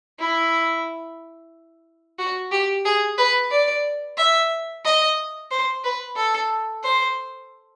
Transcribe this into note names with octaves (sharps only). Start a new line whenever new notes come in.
E4
F#4
G4
G#4
B4
D5
E5
D#5
C5
B4
A4
C5